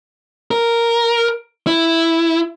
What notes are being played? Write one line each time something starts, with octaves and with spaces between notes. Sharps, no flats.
A#4
E4